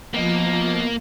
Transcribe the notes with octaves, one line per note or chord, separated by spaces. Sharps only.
F3 A#3 B3 D#5